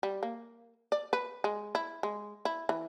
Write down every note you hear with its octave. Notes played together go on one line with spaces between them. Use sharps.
G3
A#3
D5
B4
G#3
E4
G#3
E4
E3